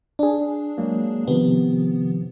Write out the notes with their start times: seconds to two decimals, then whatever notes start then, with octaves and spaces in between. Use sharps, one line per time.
0.19 D4 G#4
0.78 F#3 G#3 A#3
1.27 C3 D#3 F3 B3